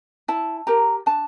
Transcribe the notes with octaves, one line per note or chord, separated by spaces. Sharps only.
E4 A5
G4 A#4 A#5
D4 A5